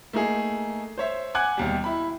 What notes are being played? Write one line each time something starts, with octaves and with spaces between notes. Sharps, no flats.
A3 A#3 D#4 G#4
C5 C#5 E5
F#5 G#5 D6 F#6 G#6
E1 D#2 G3
E4 B5